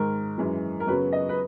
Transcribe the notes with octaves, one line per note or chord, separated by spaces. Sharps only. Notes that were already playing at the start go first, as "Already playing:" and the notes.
Already playing: G#2 D#3 G#3 A#4
F#2 E3 G#3
A#4
F#2 C#3 F#3 B3 B4
D#5
B4